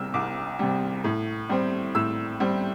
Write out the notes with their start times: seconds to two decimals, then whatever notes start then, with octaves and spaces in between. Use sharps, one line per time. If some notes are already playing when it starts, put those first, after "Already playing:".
Already playing: C2 C3 G3 E6 F6
0.14 C2 D6
0.59 C3 G3
1.04 A2
1.49 G3 C4
1.95 A2 E6
2.40 G3 C4